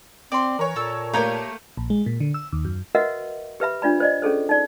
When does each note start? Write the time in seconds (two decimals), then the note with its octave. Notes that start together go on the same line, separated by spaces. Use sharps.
0.32 C4 D5 C6
0.59 E3 A#4 C#5
0.76 A#2 A4 A5 E6
1.13 A3 A#3 G4 C#5 F5 A#5 G6
1.77 A#1
1.90 G#3
2.06 A#2
2.20 D3
2.34 E6
2.52 D#2
2.65 F#2
2.95 F#4 A#4 B4 D#5 E5 F#5
3.60 G4 B4 E5 B5
3.82 D4 F4 D5 B5
4.00 C5 D5 D#5
4.22 C#4 G#4 A4 C5
4.49 D#4 D5